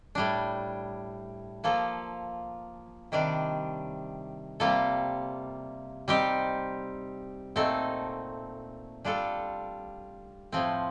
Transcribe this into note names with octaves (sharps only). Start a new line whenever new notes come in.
A2 G3 D4
F3 A#3 F4 A4
C3 D#3 G3 D4
C3 G3 A#3 F4 A4
G3 C4 D#4 G4
A#2 A3 C4 D#4 A4
G3 D4 F4 A4
A2 F3 C4